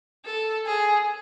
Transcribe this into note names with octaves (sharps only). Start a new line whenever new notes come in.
A4
G#4